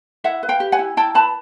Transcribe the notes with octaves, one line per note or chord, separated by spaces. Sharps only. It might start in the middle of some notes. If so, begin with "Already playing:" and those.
E4 E5 F#5
B4
F5 G5
G4
F#5 G#5
E4
E4 G5 A5
B4 A5 B5